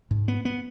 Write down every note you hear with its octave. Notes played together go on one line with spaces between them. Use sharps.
G#2
B3
B3